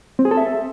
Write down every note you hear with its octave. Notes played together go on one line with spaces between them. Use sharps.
C4
G#4
A4
E5